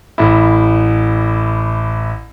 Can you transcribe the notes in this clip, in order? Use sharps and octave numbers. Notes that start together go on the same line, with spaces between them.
A1 E4